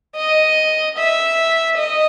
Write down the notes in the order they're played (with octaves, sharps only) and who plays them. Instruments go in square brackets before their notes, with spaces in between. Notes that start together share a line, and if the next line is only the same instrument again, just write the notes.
[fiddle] D#5
E5
D#5